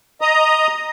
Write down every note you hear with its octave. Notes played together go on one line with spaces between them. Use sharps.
D#5 A#5 D#6